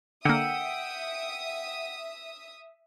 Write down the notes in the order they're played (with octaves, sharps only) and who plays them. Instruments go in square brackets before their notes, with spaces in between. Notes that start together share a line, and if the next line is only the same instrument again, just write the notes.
[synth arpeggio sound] D3 A#3 [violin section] E5 D#6 [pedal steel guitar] F#5 G5 E6